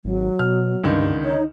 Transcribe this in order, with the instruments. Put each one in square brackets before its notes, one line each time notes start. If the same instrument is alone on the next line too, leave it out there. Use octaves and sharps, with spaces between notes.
[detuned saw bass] G#1 [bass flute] F#3
[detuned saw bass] B2 [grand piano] F6
[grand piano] C#2 D3 D#3 [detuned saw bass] G2
[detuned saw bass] D#4 [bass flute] C#5